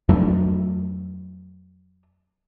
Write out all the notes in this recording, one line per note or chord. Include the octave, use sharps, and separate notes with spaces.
F2 F#3 A3 D4